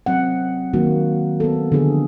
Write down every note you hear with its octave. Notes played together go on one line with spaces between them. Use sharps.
F#3 C4 F#5
D#3 F#3 A#3 F#4
B3 A4
D3 F3 B3 G#4